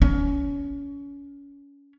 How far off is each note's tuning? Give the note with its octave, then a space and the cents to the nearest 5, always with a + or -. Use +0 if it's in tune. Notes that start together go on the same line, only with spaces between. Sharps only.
C#4 +30